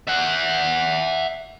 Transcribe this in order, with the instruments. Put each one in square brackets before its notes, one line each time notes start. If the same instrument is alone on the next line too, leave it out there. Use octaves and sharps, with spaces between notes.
[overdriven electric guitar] E5 F#5